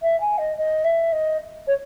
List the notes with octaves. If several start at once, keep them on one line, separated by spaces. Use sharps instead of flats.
E5
G#5
D#5
D#5
E5
D#5
C#5